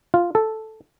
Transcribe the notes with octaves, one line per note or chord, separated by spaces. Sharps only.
F4
A4